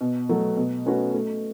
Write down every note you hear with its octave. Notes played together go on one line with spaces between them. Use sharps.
B2
F#3 A3
B2
A3 C#4 F#4 B4
A3